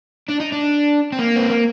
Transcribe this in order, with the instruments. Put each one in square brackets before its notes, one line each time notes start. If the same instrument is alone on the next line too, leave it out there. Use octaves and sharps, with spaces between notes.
[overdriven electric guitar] D4
D#4
D4
C4
A#3
C4
A#3